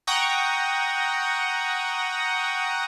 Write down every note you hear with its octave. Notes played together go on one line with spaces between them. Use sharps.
F#5 G5 A#5 C#6 D#6 A#6